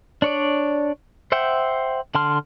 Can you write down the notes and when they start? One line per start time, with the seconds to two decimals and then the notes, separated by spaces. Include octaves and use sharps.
0.22 D4 C#5 D5
1.32 C5 E5 F#5 G5
2.15 D3 F#5 A5 C6 F6